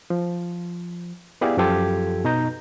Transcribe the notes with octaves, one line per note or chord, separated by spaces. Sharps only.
F3
B3 E4 G4 G#4 D5 F5
F#2 F3 F4 G4 A4 G#6
B2 D#4 A#5 G6